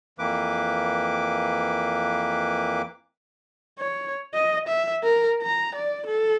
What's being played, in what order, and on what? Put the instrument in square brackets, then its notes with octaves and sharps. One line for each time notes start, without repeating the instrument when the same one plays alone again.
[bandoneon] F2 E3 A#3 B4 D6
[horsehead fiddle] C#5
D#5
E5
A#4
A#5
D5
A4